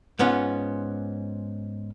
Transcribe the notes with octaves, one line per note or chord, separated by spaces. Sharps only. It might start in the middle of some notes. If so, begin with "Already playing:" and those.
G#2 B3 C#4 F4